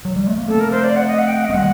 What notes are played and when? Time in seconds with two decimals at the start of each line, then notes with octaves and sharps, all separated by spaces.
0.05 F#3
0.16 G3
0.27 A3
0.38 A#3
0.48 A3 C4 A4
0.60 A#4
0.71 C5
0.84 D5
0.96 F#5
1.07 D#5
1.19 F#5
1.28 G5
1.36 F#5
1.45 D#5
1.50 A3
1.54 G3 A#3 F#5